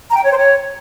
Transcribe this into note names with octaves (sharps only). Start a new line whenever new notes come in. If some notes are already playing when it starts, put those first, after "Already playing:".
A#5
G5
C#5
C5
C#5